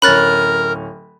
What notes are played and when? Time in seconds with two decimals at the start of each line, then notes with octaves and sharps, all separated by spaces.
0.02 D1 C#4 A#4 B5 F#6 A6